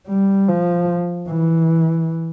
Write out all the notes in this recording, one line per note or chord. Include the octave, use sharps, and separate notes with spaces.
G3
F3
E3